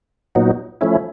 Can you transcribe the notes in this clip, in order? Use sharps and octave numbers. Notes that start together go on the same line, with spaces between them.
A#2 F#3 B3 D#4
F3 A3 C#4 E4